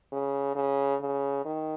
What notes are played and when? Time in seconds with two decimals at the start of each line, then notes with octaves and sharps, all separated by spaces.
0.12 C#3
0.56 C#3
1.01 C#3
1.45 D#3